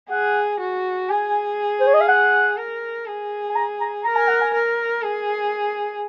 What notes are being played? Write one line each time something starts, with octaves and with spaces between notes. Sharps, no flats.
G#4 F#5
F#4
G#4 G#5
C5
C#5
D#5
F5
F#5
A#4
G#4
G#5
A#5
A#5
A#4 A#5
G#5
F#5
G#5
A#4
G#4